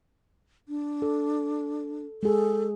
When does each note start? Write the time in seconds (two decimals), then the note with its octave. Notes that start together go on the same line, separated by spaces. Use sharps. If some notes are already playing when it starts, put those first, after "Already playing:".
0.69 D4
1.02 A4
2.23 G#3 G#4 A4